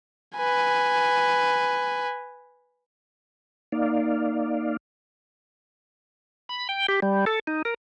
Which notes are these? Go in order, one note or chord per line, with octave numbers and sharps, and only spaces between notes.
B4 G#5
A#3 D#4 D5 F5
B5
G5
G4
G3
A4
D#4
A#4